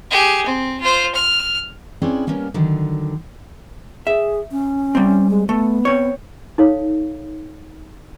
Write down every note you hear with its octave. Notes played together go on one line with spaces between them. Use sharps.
G4 G#4
C4
F4 C5
F6
C4 C#4 E4 G#4 B4 D5
G3 A#3 B3 C#4 A#4
D3 D#3 F#3
G#4 E5
C#4
G3 C4
G#3
A3 B3
C4 C#5
D#4 A4 C#5 F5